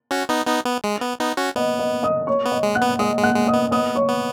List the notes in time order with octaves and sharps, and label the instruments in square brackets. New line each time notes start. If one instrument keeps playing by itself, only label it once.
[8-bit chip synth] C#4 F#4
B3 D#4
B3 D#4
B3
G#3
B3
B3 D#4
C#4 F#4
[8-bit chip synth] B3 [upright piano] D#5
[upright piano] D#5
D#5 D#6
C#5 C#6
[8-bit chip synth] B3
[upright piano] D#5
[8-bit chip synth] G#3
[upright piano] F#5 F#6
[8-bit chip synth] B3
[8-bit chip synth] G#3 [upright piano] D#5 D#6
[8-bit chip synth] G#3
[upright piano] F#5 F#6
[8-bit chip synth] G#3
[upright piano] D#5 D#6
[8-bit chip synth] B3
[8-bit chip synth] B3 [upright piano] D#5 D#6
[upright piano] C#5 C#6
[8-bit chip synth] B3